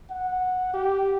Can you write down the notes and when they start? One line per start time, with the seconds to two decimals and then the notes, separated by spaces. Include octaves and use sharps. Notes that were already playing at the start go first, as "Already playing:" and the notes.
0.10 F#5
0.74 G4